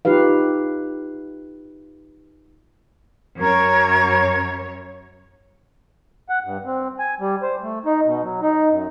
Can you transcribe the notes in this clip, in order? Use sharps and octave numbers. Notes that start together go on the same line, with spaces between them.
D#4 F4 G4 B4 F5
F#2 A#4 C#5 C#6 G#6
F#5
G2
C4
G#5
G3
C5
A3
D#4
B2
F#3
D#4
F#2